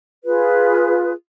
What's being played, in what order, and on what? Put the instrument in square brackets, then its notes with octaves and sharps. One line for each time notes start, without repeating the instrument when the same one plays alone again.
[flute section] F4 G#4 B4